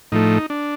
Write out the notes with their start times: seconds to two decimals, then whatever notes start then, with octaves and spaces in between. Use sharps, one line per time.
0.12 A2 F3 A3 D#4
0.50 D4